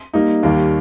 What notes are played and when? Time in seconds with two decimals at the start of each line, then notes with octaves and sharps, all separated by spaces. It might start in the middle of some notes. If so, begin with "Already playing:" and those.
0.14 G3 A#3 D#4
0.43 D#2 D#3 G3 A#3